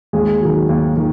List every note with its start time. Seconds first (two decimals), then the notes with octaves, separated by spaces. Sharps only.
0.13 D#2 G#3 G#4
0.41 D#3 F#3
0.69 D#2
0.97 D#3